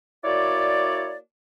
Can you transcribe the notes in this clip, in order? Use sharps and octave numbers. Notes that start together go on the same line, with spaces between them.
A#3 E4 F#4 C#5 D5